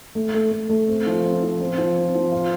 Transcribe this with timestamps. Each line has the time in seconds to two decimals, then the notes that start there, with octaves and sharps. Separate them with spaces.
0.15 A3
0.34 A3
0.52 A3
0.69 A3
0.88 C4
1.06 F3
1.24 C4
1.43 F3
1.60 C4
1.78 F3
1.97 C4
2.15 F3
2.32 F4